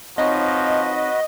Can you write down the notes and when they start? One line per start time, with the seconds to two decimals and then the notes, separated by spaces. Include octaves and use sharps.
0.18 F3 C4 D#4 F#4 B4 C#5 D#5